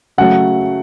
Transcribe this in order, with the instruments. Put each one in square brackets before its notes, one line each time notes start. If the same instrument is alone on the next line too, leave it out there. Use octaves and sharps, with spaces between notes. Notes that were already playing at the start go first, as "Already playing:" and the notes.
[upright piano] C#3 F#3 A3 F#5